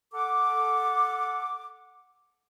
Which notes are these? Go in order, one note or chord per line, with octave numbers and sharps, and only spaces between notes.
A4 F#5 D6